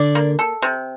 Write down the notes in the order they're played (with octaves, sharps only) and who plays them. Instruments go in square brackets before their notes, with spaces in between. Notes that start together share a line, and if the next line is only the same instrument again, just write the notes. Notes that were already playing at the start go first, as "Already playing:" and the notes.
Already playing: [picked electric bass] D3 [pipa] D5
[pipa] A#3
A4
C3